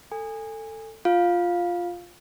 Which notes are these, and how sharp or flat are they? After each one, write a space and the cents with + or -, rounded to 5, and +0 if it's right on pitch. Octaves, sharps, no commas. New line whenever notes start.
A4 +15 G#5 -20
F4 +0 F5 +10